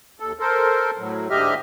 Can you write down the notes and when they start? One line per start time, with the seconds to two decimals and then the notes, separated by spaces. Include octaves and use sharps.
0.20 D#2 A4
0.40 A4 A#4 C5
0.98 A2 F#3
1.30 G#2 D3 G4 D#5 E5 F6